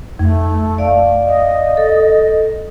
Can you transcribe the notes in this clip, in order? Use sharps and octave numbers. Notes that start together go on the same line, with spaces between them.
F2 A3
D5 F5
D#5
A4